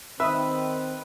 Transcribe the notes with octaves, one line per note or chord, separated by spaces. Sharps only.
D#3 C4 B4 E5 D#6